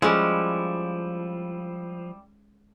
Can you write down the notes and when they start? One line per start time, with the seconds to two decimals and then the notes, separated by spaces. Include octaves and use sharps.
0.02 F3 G3 G#3 C#4 E4